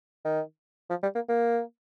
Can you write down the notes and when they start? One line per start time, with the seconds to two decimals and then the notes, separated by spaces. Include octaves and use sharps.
0.25 D#3
0.90 F3
1.03 G3
1.15 A#3
1.29 A#3